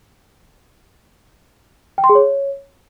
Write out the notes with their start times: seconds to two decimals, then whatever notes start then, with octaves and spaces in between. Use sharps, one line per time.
1.98 G5
2.04 C6
2.09 G#4
2.15 C#5